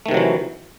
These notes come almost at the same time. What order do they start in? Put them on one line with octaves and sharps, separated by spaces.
A3 D#3 C3 F#3 E3